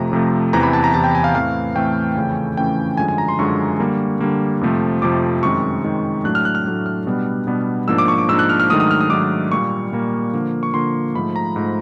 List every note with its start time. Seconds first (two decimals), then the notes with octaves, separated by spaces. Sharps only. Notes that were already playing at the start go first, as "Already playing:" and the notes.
Already playing: F2 C3 F3 A3 A#5
0.12 F2 C3 F3 A3
0.53 E2 C3 E3 A#5
0.63 B5
0.73 A5
0.84 A#5
0.93 E2 C3 E3 A5
1.04 G5
1.15 G#5
1.24 F5
1.35 A2 E3 A3 C4 F5
1.75 A2 E3 A3 C4 G5
2.16 F2 C#3 E3 A3 C#4
2.57 F2 C#3 E3 A3 C#4 G5
2.97 F#2 D3 F3 G#3 G#5
3.08 G#5
3.18 A#5
3.29 C6
3.39 F#2 D3 F3 G#3 C#6
3.80 D3 G3 A#3
4.20 D3 G3 A#3
4.61 F2 C3 F3 A3
5.02 F2 C3 F3 A3 D6
5.42 F#2 D#3 G#3 C4 C#6
5.83 F#2 D#3 G#3 C4
6.24 A2 F#3 A3 D4 F#6
6.35 F6
6.45 F#6
6.55 F6
6.66 A2 F#3 A3 D4 F#6
6.86 F6
7.07 B2 G3 B3 D4
7.47 B2 G3 B3 D4
7.88 G#2 F3 A#3 D4 E6
7.98 D6
8.08 C#6
8.18 D6
8.28 G#2 F3 A#3 D4 E6
8.39 F#6
8.50 F6
8.60 F6
8.69 G#2 D#3 F#3 A3 D4 D#6
8.80 D#6
8.91 F6
9.01 D#6
9.10 G#2 D#3 F#3 A3 D4 D6
9.52 A#2 G3 A#3 C#6
9.93 A#2 G3 A#3
10.33 D3 F3 A#3
10.63 C#6
10.74 D3 F3 A#3 C6
11.15 G#2 F3 A3 B5
11.36 A#5
11.56 G#2 F3 A3